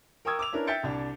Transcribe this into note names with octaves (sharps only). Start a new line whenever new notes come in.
A#4 G5 C#6 D#6 E6 G#6
D6 E6 F7
C#4 D4 E4 A#4 B4
E5 G5 G6 A6 C#7 D7
C2 D4